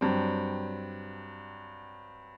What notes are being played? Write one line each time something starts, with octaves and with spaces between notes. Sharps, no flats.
G2 F#3 C4